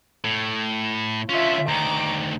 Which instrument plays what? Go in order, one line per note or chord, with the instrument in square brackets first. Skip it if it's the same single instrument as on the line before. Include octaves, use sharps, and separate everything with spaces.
[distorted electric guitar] A2
[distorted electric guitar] D3 C#4 [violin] F4 E5
[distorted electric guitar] D2 D#3 [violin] A#5 D6